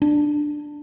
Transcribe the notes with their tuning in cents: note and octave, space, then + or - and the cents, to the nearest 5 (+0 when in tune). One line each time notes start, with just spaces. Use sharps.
D4 +10